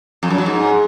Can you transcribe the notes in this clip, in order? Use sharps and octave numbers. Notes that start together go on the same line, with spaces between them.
F2
F#2
F#3
G#2